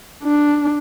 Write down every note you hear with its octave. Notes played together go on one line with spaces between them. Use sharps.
D4